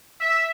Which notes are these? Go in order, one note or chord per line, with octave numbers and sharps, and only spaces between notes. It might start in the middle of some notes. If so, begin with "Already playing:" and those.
E5